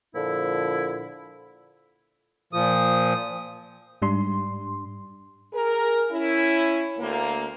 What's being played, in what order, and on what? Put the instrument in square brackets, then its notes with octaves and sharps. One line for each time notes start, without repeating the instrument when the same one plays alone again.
[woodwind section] A#2 D3 F3 E4
[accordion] A#2 F3 D#6
[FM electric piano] G#2 G3 D4 C6
[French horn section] G#4 A#4
C#4 E4
D2 A#3